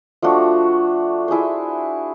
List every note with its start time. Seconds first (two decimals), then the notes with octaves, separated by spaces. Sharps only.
0.22 F3 A3 D4 F#4
1.28 E4 G#4 C5